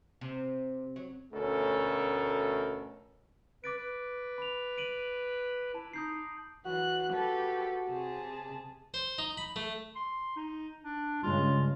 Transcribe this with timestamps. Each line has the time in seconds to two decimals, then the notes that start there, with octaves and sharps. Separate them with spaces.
0.21 C3
0.96 F#3
1.32 D2 B2 A3 C#4 A4 A#4
3.64 B4 D6 A6 D7
3.78 B4
4.38 B5 F7
4.78 D7 D#7 F#7
5.75 E4 A5
5.93 D#4 D#6 G6 C7
6.66 E3 F#4 F#6
7.11 G4 A4 B4
7.89 C3 G#4 A5
8.94 C5
9.18 D#4
9.37 B5
9.56 A3
9.95 C6
10.36 D#4
10.84 D4
11.23 G2 C#3 G#3 F4